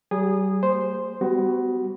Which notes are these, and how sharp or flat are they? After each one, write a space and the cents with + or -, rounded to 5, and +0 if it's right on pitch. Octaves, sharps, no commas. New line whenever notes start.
G3 -40 G#4 -10 D#6 -20
A#3 -40 C5 +0
G3 +0 B3 +30 F#4 +15